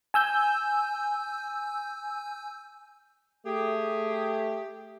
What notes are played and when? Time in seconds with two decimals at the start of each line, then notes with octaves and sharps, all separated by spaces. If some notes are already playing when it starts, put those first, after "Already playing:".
0.14 G#5 E6 G6
3.46 A3 G4 G#4